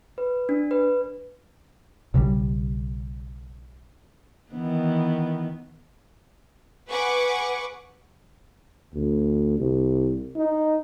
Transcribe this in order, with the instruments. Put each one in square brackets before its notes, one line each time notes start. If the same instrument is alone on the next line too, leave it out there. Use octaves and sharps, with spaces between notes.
[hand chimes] B4
D4
B4
[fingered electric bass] B1 C#3 F3 G3
[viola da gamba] D#3 E3 B3
[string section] G#4 B4 F#5 C#6 D6
[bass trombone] D2
C2
D#4